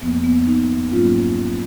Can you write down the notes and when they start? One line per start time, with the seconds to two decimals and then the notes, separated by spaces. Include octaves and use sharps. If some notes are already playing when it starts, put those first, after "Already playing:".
0.01 F2 F3 A#3 B3
0.24 B3
0.46 B3 D#4
0.91 G#2 F#3 A#3 C#4 F4